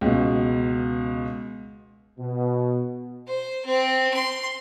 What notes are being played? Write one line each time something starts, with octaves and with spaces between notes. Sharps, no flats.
C#2 B2
B2
C5
C4
C6